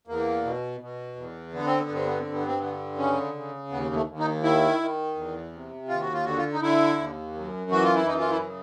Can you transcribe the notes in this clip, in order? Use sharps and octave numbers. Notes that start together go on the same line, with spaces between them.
E2 A#3
B2
B2
E2
D3 B3
C4
B3
G2 C4
B3
C4
G2
B3
C4
D3 B3
C#3 C#4
C#3
D#2 B3
A3
D#2
D#4
D#3 E4
D#3
E2
C3
D#2 F4
F#4
F4
D3 F#4
F4
D#4
D3 E4
D#2
F#2
E3 F#4
F4
E4
F#2 D#4
F4
E4
C#3